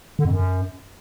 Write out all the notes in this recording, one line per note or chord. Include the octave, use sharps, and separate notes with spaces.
D3
F2
F#2